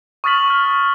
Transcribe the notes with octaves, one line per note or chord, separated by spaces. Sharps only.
C#6 D#6 F6 A6 B6 F#7
C#6 F6